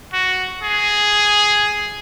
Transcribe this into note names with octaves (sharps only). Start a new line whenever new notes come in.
F#4
G#4